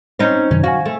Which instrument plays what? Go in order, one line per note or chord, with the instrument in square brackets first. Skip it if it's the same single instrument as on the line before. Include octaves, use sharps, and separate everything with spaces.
[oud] C4 C#4 D#4 [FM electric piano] C5
[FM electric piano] F#2 C3 D#3 [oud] C#4
[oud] F#4 [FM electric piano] F5 G#5
[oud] A3